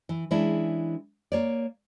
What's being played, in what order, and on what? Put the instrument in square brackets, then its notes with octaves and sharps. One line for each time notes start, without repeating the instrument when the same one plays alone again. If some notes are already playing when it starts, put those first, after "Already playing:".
[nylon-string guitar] E3
E3 G#3 C#4 D4 E4
A#3 C#5 D5